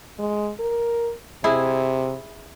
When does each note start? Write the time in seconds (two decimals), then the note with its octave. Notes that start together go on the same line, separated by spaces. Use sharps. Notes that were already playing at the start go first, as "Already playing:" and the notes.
0.19 G#3
0.59 A#4
1.44 C3 E4 G#4